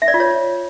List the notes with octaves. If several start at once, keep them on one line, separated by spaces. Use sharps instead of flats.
E5
D5
F4
C#5